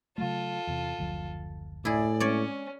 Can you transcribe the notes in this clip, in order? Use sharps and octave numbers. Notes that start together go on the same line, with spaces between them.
C#3 F#3 A3 F4 A4
E2 C3
F#1 D2 F3
A2 E4 G#4 D5
G#3 C4 C#4 C#5 D5